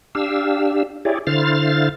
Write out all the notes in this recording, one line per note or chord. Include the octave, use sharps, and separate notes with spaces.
D4 G4 F5 E6
E4 G4 G#4 C#5 D5
D3 E4 C5 F5 F6 A6